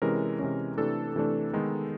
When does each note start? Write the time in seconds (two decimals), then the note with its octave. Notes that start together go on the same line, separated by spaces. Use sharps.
0.02 C3 E3 G#3 C#4 A#4
0.39 C3 E3 G#3 C#4
0.77 C3 E3 A3 D4 A4
1.15 C3 E3 A3 D4
1.53 D#3 G#3 B3 D#4